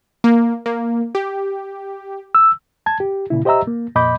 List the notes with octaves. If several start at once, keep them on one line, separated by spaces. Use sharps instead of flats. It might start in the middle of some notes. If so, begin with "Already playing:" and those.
A#3
A#3
G4
E6
A5 G#6
G4
A#2 C#3 E4
G4 C5 D#5 E5 A#5 E6
A#3
F2 A#2 D#5 B5 D6 G6